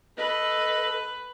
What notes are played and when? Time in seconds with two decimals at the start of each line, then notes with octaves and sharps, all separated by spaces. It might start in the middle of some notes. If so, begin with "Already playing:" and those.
0.18 A4 B4 D#5